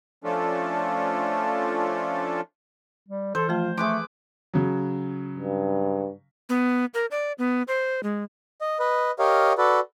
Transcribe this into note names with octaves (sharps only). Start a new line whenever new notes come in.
F3 A3 C#4 D4 F4 A4
G3
E3 A4 C5
F3 A3 F4 A5
A3 G#4 B4 C6 D6
C#3 F#3
G2
B3
A#4
D5
B3
C5
G#3
D#5
B4 D#5
G4 A#4 C#5 D#5 F5
F#4 A4 B4 D5